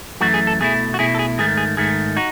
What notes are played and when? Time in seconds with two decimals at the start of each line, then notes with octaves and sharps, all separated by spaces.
0.21 F#2 E3 A3 F#4
0.34 G#4
0.47 A4
0.61 B2 A3 E4 G#4
0.94 F#4
0.99 B2 A3 E4 G#4
1.15 A4
1.19 G#4
1.38 G#2 D#3 A3 G#4
1.57 G#4
1.77 G#2 D#3 A3 G#4
2.17 D#4 F#4